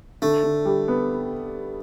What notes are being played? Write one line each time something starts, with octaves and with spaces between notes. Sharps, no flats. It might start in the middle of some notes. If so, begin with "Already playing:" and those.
D3 A3
D3
G3
B3